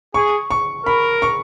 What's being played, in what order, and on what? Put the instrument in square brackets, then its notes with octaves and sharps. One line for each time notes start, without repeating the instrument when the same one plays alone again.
[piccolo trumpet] G#4 [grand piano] C#6
[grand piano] C#6
[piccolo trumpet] A#4 [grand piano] B5
[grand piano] C#6